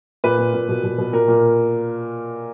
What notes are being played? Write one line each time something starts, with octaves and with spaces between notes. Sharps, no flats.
A#2 B4
A#2
A#2
B2
B2
B2
A#2 A#4
A#2